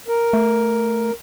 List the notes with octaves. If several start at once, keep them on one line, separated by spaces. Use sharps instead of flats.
A#4
A3